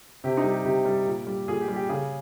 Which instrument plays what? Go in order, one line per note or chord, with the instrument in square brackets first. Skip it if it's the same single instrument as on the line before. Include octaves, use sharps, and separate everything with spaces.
[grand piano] C3 G4
D#4
G3
G4
C3 G4
G3
A#2
G3
A#2 G#4
G4
G3
G4
C#3 G#4